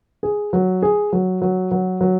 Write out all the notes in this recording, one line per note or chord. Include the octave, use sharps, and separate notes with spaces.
G#4
F#3
G#4
F#3
F#3
F#3
F#3